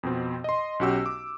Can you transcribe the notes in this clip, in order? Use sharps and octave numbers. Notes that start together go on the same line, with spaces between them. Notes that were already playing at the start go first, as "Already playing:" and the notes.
F2 B2 C4
D#5 C6
B1 C#4 F#4 G4 E6
D6